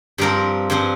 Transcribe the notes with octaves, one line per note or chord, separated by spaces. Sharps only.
G2 F3 C4 G4 A#4
G2 F3 C4